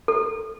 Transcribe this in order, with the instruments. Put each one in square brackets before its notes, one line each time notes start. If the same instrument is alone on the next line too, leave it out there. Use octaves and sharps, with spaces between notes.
[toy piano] A4